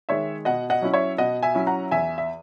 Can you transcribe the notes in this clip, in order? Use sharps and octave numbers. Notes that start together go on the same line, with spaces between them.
D#3 G#3 C#5 E5
B2 D#5 F#5
D#5 F#5
F#3 C#4 E4
C#5 E5
B2 D#5 F#5
E5 G#5
F#3 C#4 E4
F#5 A#5
E2 E5 G#5
E5